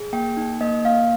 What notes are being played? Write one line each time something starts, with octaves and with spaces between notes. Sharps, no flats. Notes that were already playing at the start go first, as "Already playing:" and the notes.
Already playing: G#4
A#3 G5
D#4
A#3 D#5
A#3 F5